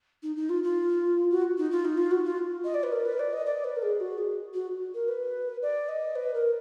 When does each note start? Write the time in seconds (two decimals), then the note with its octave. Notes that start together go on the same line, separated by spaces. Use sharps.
0.23 D#4
0.36 D#4
0.49 F4
0.63 F4
1.30 F#4
1.58 D#4
1.71 F4
1.85 D#4
1.98 F4
2.11 F#4
2.25 F4
2.65 D#5
2.74 D5
2.83 B4
2.92 A#4
3.05 B4
3.19 D5
3.33 D#5
3.46 D5
3.64 B4
3.76 A#4
3.82 G#4
4.00 F#4
4.18 G#4
4.54 F#4
4.94 A#4
5.08 B4
5.62 D5
5.89 D#5
6.15 B4
6.34 A#4